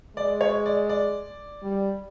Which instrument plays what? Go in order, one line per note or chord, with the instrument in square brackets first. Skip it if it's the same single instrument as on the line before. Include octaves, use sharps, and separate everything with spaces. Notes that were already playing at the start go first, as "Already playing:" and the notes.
[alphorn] G#3 [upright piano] D5
[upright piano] C#5
D5
D5
[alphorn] G3